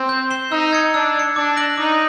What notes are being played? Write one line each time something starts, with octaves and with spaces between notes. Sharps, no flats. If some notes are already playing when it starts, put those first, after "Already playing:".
Already playing: C4
G6
C7 E7 G7
D#4 E6
G#6 C#7
D4 E6
G#6 C#7
D4 D6
F#6 A#6 D7 F#7
D#4 D6